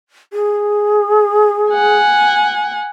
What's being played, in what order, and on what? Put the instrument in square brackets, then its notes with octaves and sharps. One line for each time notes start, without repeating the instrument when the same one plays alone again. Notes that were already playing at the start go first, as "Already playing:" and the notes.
[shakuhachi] G#4
[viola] F#5 G#5